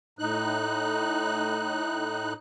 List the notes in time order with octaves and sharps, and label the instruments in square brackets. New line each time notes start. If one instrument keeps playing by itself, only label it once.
[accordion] A2 D#4 F#6